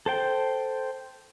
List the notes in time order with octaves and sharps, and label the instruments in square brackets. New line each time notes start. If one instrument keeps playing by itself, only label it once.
[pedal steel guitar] A4 C5 G5